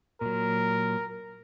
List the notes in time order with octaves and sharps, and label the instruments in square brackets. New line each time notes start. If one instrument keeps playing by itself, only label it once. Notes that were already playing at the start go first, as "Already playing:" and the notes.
[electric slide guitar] A#2 F#3 [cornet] A#4